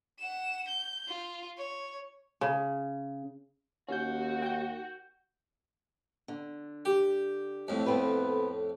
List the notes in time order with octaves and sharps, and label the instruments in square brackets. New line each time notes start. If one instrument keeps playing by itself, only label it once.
[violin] F#5 E7
G6
F4
C#5
[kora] C#3
[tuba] D#2 [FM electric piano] C#4 G6 [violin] F#4
[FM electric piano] G5 G6
[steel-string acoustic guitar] D3
[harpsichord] G4
F2 A2
[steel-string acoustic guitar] B3 C4 B4